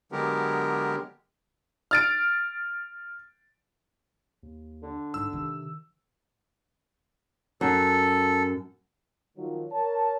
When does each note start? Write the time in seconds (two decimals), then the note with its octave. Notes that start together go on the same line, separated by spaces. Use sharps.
0.12 D3 F#3 G#3 B3 G4 A#4
1.91 F6 A6 D7
4.43 D#2
4.83 D3
5.14 G1 G#2 E6
5.33 C3 D#3
7.61 F#2 A4
9.37 D#3 F3 F#3
9.72 A#4 C#5 A5